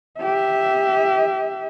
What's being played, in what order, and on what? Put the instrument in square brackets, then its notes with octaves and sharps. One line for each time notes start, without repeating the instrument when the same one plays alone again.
[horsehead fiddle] G4 E5